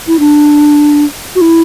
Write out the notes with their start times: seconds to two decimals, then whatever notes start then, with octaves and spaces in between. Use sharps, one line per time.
0.08 E4
0.19 D4
1.35 F#4
1.41 E4